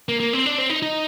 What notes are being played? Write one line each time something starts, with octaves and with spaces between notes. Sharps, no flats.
A#3
A#3
C4
D4
C4
D#4
D#4